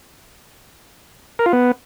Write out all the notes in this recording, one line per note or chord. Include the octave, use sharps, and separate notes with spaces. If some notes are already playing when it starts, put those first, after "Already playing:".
A#4
F4
B3